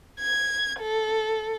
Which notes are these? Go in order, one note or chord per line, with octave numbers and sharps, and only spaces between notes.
G#6
A4